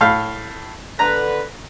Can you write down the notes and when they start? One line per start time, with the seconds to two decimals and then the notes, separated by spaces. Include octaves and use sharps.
0.01 A2 F5
0.99 D3 B4 A#5